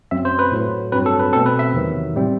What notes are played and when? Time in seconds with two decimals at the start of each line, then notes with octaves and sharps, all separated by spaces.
0.11 F#2 F#3 C4 E5
0.25 C5
0.39 B4
0.52 A2 F#3 A3
0.92 G2 F#3 C4 B4
1.06 A4
1.20 B4
1.33 B2 A3 C4 A4
1.46 B4
1.59 E5
1.73 E2 C3 D#3 F#3
2.13 A2 G3 C4